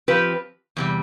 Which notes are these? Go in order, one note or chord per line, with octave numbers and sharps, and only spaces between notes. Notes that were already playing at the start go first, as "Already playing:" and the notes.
F3 C4 G4 B4
E2 C3 G3